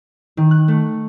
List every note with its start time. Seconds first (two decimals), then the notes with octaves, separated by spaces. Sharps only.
0.37 D#3
0.51 F#6
0.68 A3